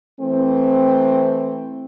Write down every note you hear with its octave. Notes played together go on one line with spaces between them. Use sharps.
E3 A3 C4